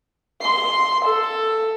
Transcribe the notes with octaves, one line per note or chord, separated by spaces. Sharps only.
C6
A4